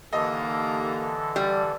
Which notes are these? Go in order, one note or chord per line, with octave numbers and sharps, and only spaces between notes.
D#2 D3 E3 A#3 A4 D#5
G3